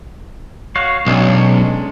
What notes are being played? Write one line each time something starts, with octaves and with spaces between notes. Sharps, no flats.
F#4 C#5 F5
B1 G#3 C#4 D4